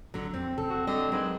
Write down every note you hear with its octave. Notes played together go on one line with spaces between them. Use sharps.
G#1 D3 F#3
F2 C4
C#3 C4 A4
D#1 F#4
D3 G3 D#5
G#2 F#3 A#4 B4